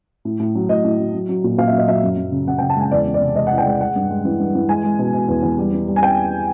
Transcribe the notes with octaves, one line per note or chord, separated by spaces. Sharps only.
A2
A2
F#3
A2 D#5
A2
F#3
F#3
F#3
A#2
A#2 F5
E5
F#3
D#5
F#3 E5
F#2
F#2
C#3
C#3 F#5
G5
C#3
A5
G#3 G#5
E2 D5
E3
D5
C3
G#3 D#5
F#5
E3
G5
G#3 F#5
G#3 F#5
G2
G#3
E3
G2
E3
G#3 G#5
G#3
B2
B2
E2
E2
G3
E3
G3
G#5
G5